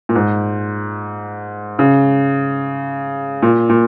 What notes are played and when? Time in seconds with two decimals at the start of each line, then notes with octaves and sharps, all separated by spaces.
0.09 A#2
0.15 G#2
1.79 C#3
3.43 A#2
3.70 A#2